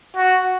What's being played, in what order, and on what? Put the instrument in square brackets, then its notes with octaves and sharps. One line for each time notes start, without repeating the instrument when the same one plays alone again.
[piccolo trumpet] F#4